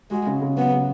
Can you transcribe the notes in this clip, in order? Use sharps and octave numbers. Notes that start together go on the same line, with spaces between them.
G#3 F#4
C#3
C#3
F#3 B3
C#3